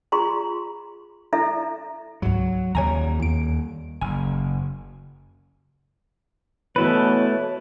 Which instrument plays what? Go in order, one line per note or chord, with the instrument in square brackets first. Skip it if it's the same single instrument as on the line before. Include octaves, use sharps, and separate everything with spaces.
[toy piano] F4 G#4 A#5 C6
E4 A4 E5 A#5
[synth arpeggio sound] C#2 G#2 [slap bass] F#3
[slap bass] D#2 G3 [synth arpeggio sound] C#5 G#5 A#5
[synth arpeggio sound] E2 D7
[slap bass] F#1 [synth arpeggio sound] G#5
[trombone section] B2 E3 [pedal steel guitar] A3 E4 B4 [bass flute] C#5